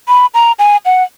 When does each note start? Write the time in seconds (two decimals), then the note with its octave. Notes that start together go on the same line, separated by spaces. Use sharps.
0.08 B5
0.34 A#5
0.59 G#5
0.85 F#5